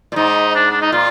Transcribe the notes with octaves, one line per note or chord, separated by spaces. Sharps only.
A#2
G#2 D#4
D4
D4
D#4
A#2 F4